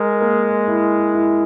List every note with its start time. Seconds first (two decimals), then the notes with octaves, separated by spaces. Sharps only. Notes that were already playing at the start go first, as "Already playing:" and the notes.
Already playing: G#3 A#4
0.21 A#3
0.68 E4
1.15 E4